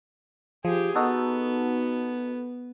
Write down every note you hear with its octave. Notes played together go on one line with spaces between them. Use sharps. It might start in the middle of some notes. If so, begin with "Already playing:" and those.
F3 G4 G#4
B3 D#4 F#4 A4